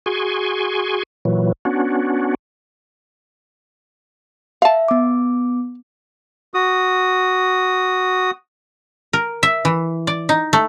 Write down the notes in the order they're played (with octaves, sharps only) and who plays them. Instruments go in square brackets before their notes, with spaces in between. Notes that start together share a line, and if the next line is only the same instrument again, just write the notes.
[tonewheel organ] F#4 G#4 G#5 C6 C#6
A#2 E3 F#3
B3 C#4 D4 F#4
[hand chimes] E5 [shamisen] F5 A5
[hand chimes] B3 D6
[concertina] F#4 D#6
[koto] A#4
E5
E3
D5
D#4
A3